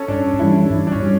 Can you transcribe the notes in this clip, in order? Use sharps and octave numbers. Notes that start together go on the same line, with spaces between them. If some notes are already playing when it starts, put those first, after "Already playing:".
Already playing: C#4 A4
G2 D4
E3 G3 D4 E4
G2
D4
C#4
G3